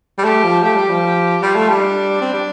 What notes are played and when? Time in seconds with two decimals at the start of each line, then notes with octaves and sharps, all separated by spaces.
0.18 G3
0.24 A3 G4
0.44 F3
0.63 A3 G4
0.76 G3
0.89 F3
1.42 G3 F4
1.55 A3
1.69 G3
1.82 D4
2.21 C4
2.33 G3